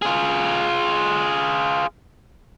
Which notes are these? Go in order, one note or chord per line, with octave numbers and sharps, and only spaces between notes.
F4 G#4